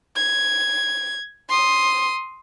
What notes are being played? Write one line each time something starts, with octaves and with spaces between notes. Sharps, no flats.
G#6
C6 D#6